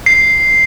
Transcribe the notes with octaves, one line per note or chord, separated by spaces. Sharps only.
C7